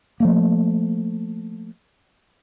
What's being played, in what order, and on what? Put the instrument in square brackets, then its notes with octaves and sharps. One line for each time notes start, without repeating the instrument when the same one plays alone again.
[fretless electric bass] F3 A3 A#3